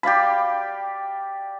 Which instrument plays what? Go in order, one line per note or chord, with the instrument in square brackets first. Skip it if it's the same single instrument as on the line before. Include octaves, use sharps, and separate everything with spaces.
[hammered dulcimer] G4 D5 F5 B5